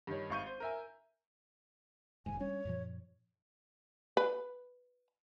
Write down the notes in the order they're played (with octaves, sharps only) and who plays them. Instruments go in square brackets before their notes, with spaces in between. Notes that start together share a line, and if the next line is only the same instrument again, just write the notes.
[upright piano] G2 D#3 C#5
G#1 F5 C#6 G6 D#7
C5
A#4 E5 G#5
[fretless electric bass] F1 D#2 G#2 [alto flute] G#5
[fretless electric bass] G3 C#4 D4 [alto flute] C#5
[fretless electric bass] F#2 A#2 F3
[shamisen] B4